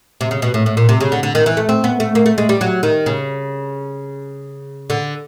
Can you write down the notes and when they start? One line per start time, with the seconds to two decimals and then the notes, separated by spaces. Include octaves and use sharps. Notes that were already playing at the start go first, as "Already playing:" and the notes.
0.21 C3
0.31 C#3
0.42 B2
0.54 A2
0.66 A2
0.77 A#2
0.89 C3
1.01 C#3
1.12 D3
1.23 D3
1.35 D#3
1.46 E3
1.57 A3
1.69 C4
1.84 B3
2.00 A3
2.15 A#3
2.26 A3
2.38 G#3
2.49 G3
2.61 F#3
2.83 D#3
3.06 C#3
4.90 D3